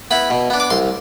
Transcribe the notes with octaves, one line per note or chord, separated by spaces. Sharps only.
B3 E4 B5
B2
B3 D4
D6
C2 C6